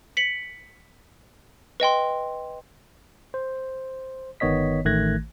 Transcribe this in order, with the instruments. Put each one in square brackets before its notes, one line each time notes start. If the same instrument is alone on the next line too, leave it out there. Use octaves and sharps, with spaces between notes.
[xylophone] B6 C#7 F#7
B4 D#5 G5 C6
[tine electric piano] C5
G1 D#3 B3 C#5 D#5 B6
A1 D#3 A3 F#6 G#6 A#6